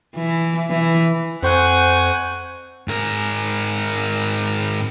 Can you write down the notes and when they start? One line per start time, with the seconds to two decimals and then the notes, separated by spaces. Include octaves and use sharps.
0.16 E3
0.70 E3
1.43 F2 C5 F#5 G#5 C#6 F#6
2.88 G#2 A#4